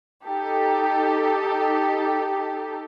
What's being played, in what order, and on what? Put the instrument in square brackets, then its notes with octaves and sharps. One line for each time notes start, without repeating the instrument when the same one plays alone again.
[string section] D#4 G4 A4